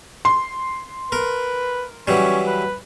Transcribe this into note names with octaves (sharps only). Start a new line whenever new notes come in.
C6
A#4 B4
E3 F#3 G3 C#4
B4